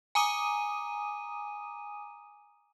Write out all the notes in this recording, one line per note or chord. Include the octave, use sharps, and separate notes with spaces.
G#5 A#5 D6 D#6 D#7